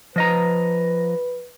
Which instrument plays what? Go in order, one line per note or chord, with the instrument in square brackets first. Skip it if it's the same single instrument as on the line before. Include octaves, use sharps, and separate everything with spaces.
[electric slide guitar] F3 D#5 A#5 [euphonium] B4